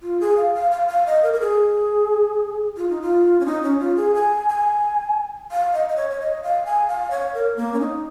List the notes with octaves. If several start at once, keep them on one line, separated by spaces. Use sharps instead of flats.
F4
G#4
F5
F5
F5
F5
D#5
A#4
A#4
G#4
F4
D#4
F4
C#4
D#4
C#4
F4
G#4
G#5
G#5
F5
D#5
D#5
C#5
C#5
D#5
F5
G#5
F5
C#5
A#4
A#3
C#4
D#4